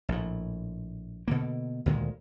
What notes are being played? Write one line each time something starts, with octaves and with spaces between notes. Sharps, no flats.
A#1 A2
B2 D3 A#3
D2 A#2 D#3 G#3